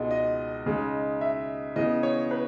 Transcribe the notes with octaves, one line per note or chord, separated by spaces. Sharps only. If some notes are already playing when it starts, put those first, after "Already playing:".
Already playing: C#2 B2 G#3 D#4
D#5
C#3 G#3 D#4
E5
C#3 E3 B3 D#5
C#5
B4